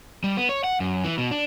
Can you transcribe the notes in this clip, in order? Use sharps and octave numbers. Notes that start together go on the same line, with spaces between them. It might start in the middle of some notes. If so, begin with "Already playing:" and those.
G3
B3
C#5
F#5
F#2
E3
B2
D4